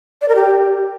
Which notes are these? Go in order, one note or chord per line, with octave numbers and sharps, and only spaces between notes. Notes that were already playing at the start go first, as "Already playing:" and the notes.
D5
A#4
G4